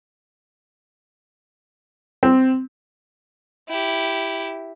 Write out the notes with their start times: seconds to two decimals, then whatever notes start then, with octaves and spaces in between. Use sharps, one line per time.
2.23 C4
3.68 E4 G4